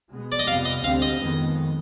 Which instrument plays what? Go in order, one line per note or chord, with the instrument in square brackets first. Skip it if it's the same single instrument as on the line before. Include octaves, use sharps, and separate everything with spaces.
[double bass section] B2 G#3 B3
[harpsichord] D5
D#5
[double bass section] F2 C3 G3 B3 [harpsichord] F5
[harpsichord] D#5
[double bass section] D2 D3 G3 C4 [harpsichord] F5
[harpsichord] D#5
[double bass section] F2 D#3 G#3 B3